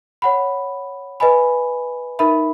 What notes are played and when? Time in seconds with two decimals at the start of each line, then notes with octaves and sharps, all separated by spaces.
0.22 C#5 F#5 B5
1.20 B4 D#5 G#5 B5
2.19 D#4 A#4 E5 B5